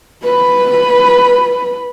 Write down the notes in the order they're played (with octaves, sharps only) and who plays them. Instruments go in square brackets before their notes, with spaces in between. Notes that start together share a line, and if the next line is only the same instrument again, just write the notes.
[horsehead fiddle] B4 B5